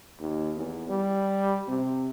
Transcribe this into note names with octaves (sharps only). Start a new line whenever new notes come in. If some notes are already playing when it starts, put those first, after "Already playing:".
D#2
E2
G3
C3